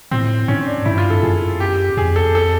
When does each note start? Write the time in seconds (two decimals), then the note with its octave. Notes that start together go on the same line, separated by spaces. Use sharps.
0.11 A2 C4
0.48 G#2 C#4
0.67 D4
0.85 G2 E4
0.98 F4
1.10 A4
1.23 F#2 G#4
1.60 G4
1.97 F2 G#4
2.16 A4
2.35 A4